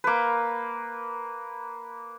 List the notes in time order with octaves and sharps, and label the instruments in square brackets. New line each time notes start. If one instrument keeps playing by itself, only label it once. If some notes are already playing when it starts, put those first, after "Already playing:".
[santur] A#3 B4